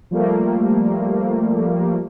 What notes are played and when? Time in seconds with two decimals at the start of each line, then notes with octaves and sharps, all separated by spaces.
0.11 F3 G3 A3 A#3